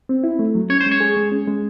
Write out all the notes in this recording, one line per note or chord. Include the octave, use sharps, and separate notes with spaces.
C4
E4
A3
F#3
C#4 C#5
C5
G#3
C#5
G#4
G#3
C#4
G#3